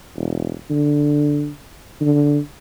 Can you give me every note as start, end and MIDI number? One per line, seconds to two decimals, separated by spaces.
0.16 0.53 28
0.70 1.50 50
2.01 2.39 50